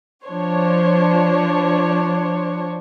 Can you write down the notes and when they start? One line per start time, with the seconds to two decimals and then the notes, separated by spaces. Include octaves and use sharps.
0.25 F3 D4 C5 C#5